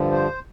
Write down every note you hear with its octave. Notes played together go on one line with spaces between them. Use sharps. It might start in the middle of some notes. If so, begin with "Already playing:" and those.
Already playing: G2 D3 F3
C5